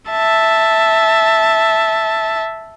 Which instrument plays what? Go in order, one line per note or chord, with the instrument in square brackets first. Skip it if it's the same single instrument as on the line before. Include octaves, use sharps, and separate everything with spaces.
[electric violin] E5 A5